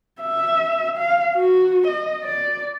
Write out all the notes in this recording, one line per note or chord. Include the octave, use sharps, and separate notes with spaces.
E5
F5
F#4
D#5
D5